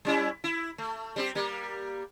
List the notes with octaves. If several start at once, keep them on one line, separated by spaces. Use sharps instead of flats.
G3 C#4 E4
E4
A3
G3 C4 G4
G3 A#3